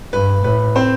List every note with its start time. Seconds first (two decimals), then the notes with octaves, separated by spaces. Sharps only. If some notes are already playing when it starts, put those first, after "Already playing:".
0.13 G2 B4
0.44 A2 B4
0.76 C4 C5